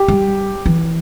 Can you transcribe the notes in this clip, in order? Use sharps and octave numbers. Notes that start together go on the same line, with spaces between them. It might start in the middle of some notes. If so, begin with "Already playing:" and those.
Already playing: G4
G3
E3